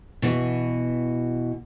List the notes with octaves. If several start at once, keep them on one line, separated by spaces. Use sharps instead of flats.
B2 E3 F#4